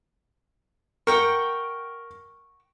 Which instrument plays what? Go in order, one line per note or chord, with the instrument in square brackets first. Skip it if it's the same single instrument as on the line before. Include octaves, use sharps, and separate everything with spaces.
[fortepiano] A#4 [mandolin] F#5 G5 C#6